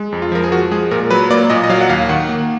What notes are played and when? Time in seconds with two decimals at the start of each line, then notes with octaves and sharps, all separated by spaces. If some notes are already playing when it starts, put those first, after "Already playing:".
Already playing: G#3
0.13 F2
0.22 F4
0.32 F3 A#4
0.44 G#4
0.52 F3 F#4
0.71 G#3 G#4
0.91 A#2 A#4
1.11 F#3 B4
1.30 A#3 D5
1.50 A#2 D#5
1.63 D#5
1.70 F#3 F5
1.81 F#5
1.89 D#2 F5
2.09 D#3 F#5
2.29 A#3